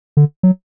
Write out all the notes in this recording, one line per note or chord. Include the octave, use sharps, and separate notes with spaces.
D3
F#3